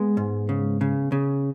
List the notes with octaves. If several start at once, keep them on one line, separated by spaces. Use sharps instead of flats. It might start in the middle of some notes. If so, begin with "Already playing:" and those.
Already playing: G#3 B3
G#2
C#3
C#3
C#3